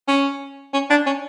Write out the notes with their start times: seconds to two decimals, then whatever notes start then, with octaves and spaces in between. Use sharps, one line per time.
0.08 C#4
0.74 C#4
0.90 D4
1.06 C#4